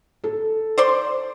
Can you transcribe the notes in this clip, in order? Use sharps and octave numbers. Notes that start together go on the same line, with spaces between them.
A4
C5 D5 C6